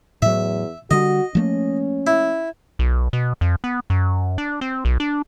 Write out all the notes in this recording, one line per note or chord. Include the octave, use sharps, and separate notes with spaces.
E2 A2 F#3 E5
D3 G3 F#4 D#5
F3 A3 A#3 C#4
E4
B1
B2
F2
B3
F#2
D4
C4
B1
D4